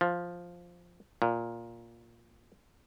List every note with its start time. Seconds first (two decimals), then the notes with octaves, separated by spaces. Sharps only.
0.01 F3
1.22 A#2